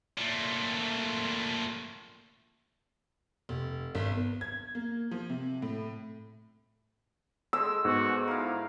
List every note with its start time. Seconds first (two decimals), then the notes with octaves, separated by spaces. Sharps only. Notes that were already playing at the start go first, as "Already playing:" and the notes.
0.18 A#2 A3
3.49 F1
3.95 G#1
4.12 B3
4.41 G#6
4.75 A#3
5.11 F3
5.30 C3
5.62 A2
7.53 D3 G#3 E6
7.85 G#2 B3 F#4
8.28 E4 A#4 F5